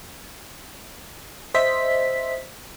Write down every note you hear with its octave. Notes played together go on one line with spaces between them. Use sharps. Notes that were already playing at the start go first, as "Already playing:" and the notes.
C5 D#5 E5 B6